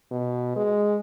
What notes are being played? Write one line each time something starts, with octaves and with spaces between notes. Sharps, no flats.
B2
G#3